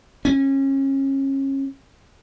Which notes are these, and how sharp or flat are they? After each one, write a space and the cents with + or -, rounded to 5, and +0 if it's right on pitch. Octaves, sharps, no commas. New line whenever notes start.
C#4 -30